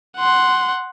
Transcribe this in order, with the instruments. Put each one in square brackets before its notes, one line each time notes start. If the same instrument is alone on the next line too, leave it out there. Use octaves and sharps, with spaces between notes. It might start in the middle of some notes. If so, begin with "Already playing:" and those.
[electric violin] F#5 C6